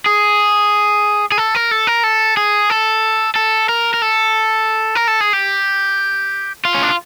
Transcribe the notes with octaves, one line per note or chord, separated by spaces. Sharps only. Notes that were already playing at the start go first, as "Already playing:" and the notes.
G#4
G#4
A4
A#4
A4
A#4
A4
G#4
A4
A4
A#4
A#4
A4
A#4
A4
G#4
G4
F4
C#4
D4